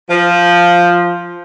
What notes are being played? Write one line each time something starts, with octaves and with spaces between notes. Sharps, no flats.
F3